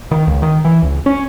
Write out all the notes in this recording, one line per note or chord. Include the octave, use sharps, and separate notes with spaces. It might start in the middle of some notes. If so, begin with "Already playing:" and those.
D#3
C#2
D#3
E3
C#2
C#4